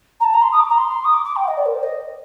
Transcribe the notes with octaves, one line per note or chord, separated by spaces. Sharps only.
A#5
A5
A#5
C6
D#6
D6
A#5
C6
D#6
D6
D6
G5
F#5
D#5
D5
A#4
C5
D#5